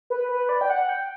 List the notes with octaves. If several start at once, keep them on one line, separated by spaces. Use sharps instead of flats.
B4
B4
D5
G5
F#5
G5